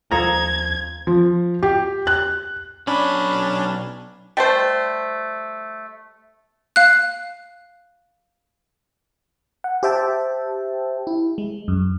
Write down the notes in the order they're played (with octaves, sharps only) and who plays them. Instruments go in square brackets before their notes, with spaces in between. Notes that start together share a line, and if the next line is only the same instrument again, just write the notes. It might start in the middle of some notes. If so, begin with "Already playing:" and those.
[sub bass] D#2 [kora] F3 A4 D#5 [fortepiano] A#5 [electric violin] G#6
[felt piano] F3
G4
F#6
[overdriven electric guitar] B1 B5 [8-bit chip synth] C#4 D4
[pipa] G3 A3 C5
[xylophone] F5 F#6
[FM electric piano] F#5
G4 C5 E5 G5 A5
E4
G#3
F#2